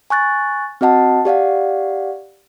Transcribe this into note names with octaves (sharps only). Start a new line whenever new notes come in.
G#5 C#6 F#6 A6
C4 F#4 D#5 F#5 A5
G4 D5 F5 F#5